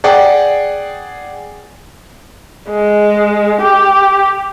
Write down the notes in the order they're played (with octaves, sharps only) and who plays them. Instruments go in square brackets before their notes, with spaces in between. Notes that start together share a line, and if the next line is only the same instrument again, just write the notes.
[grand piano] G#4 D5 F#5 G5
[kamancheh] G#3
G4